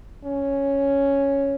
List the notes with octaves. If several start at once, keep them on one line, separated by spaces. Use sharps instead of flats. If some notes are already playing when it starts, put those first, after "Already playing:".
C#4